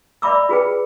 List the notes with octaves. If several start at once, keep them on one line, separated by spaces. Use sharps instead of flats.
D5 E5 B5 D6 E6
F4 G#4 B4 G5